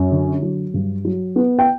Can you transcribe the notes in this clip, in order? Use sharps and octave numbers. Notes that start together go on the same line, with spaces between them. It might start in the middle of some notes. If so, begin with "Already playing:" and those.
Already playing: F#2
D3
F#3
G2
F#3
B3
G5